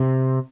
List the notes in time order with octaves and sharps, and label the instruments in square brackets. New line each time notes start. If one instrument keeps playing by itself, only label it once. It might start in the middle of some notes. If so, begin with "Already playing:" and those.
Already playing: [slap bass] C3 C4